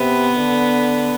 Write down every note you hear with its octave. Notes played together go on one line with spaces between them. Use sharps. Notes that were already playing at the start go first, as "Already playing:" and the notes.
Already playing: C3 B3
D3